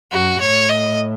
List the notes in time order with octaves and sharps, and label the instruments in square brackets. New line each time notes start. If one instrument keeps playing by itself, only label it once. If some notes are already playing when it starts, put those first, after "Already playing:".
[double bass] F#2 [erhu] F#4
[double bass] A2 [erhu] C#5
[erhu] D#5